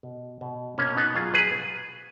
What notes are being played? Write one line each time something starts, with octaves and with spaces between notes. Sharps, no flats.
B2
B2
B2 A#3 C#4
B3 D#4
F#3 F4 G#4
G#4 B4